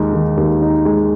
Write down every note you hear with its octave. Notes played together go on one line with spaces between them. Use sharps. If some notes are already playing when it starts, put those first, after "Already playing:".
Already playing: D#2 G#3 D#4
D#3
D#2
D#4
G#3